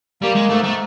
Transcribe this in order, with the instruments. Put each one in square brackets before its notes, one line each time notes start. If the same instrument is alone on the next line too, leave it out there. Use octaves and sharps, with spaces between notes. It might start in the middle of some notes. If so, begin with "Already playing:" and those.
[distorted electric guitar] G3 [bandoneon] A#3
[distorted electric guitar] G#3
[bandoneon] G#2 [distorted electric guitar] A3
[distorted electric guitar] A3